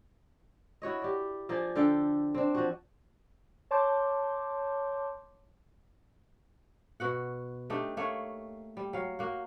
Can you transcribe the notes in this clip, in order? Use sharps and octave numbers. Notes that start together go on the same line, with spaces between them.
E4 F#4 C#5 D#5
G4 D5
F3 A#3 G#4 D5
D3 A4 F5 G5
C4 D4
F3 F#4
C#5 A5 C6 D6 G6
B2 F#4 F#5
A3 D4 D#4 G4
A3 A#3 C#5
G3
F#3 F5
A#3 F#4